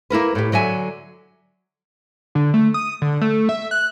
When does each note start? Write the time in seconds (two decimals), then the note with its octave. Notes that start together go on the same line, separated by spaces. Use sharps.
0.10 A#3 E4 A#4 B4
0.35 A2 G4
0.52 D3 F#3 E5 G#5
2.35 D3
2.54 A3
2.74 D#6
3.02 D3
3.21 A3
3.49 E5
3.71 F#6